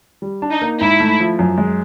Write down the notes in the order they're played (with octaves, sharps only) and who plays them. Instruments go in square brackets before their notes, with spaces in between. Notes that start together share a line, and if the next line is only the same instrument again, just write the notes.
[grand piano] G3
D4
[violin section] D#4
[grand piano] A#3
[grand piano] G#2 [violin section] E4
[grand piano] A3
F3
F#2
G#3